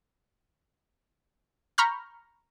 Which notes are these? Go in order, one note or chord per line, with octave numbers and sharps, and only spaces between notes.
A#5 B5 C#6 F6 G6